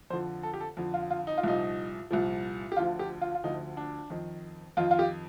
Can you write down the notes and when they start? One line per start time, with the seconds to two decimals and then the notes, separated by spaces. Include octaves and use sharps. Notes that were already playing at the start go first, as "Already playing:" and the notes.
0.10 F2 D3 F3 C5
0.43 A4
0.54 G4
0.61 A4
0.77 F2 D3 F3
0.94 F4
1.10 F4
1.27 D#4
1.38 F4
1.43 C2 A#2 F3 D#4
2.11 C2 A#2 F3
2.72 G4
2.77 D2 D3 F3 F4
2.99 G4
3.21 F4
3.35 F4
3.44 D2 D3 F3 D#4
3.77 D4
4.10 F2 D#3
4.77 F2 D#3 F4
4.91 F4
4.99 G4